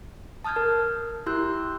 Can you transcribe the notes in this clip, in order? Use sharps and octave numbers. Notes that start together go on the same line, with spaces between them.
A5 D#6 F6 G6 G#6
A#4
E4 G4 C6 E6 F#6 G6